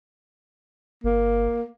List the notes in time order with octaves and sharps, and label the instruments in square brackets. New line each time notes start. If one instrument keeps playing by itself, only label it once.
[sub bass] G1 [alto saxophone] A#3